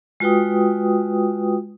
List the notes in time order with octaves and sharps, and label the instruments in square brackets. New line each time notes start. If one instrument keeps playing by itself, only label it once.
[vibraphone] G#3 F4 F#4 B4 G5 D#6